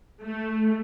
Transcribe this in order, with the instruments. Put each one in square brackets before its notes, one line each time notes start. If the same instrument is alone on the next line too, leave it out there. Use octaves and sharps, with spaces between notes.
[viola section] A3